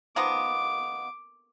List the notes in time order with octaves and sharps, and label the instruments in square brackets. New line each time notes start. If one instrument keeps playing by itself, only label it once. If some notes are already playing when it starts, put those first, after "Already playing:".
[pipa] D#3 F3 B3 [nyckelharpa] D6